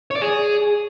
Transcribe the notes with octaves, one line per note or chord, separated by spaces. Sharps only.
C#5
D5
G#4